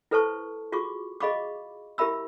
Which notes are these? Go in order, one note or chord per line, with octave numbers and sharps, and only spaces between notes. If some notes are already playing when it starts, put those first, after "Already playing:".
E4 A4 B4 C5 A5 C#6
F4 F#4 G#4 C#6 D6
G#4 D#5 F5 B5 C#6 D6
E4 G4 A#4 E5 B5 E6